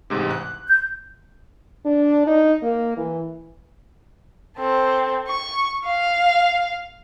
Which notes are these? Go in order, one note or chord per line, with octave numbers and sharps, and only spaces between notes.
A1 G#2 C3
F#6
G6
D4
D#4
A#3
E3
C4 A4
C#6
F5